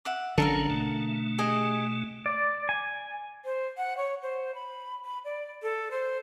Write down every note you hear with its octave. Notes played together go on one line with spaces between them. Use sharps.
E5 F#5 D6
A1 D3 F#3 C#4 A4 A#4 F5
B2 A3
G4 G#4 D#5
D5
G#5
C5
F#5
C#5
C5
B5
B5
D5
A4
C5